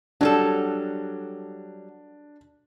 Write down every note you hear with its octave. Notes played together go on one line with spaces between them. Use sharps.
F#3 G3 D4 A4